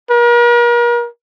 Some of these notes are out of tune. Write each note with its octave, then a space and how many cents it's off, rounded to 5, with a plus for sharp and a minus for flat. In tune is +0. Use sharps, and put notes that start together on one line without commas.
A#4 +40